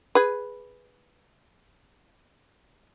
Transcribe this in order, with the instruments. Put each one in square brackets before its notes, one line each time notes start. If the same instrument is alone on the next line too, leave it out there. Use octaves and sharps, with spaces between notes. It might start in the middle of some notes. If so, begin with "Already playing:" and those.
[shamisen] G#4 B4